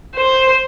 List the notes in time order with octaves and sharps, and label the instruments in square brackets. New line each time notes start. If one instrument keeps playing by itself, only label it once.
[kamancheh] C5